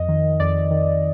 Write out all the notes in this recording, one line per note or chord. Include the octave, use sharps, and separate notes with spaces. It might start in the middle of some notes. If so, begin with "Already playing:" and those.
Already playing: F2 D#5
D#3
F2 D5
D#3